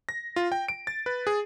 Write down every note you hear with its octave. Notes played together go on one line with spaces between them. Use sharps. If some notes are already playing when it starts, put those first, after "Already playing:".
A#6
F4
G5
D7
A6
B4
G#4